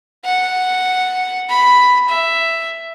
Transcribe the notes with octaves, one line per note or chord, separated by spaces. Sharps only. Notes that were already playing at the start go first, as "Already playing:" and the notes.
F#5
B5
E5